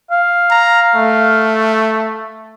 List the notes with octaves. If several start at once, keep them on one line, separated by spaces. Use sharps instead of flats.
F5
A#5
A3